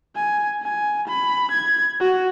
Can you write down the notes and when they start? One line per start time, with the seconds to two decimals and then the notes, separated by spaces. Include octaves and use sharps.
0.16 G#5
0.63 G#5
1.08 B5
1.51 G#6
2.00 F#4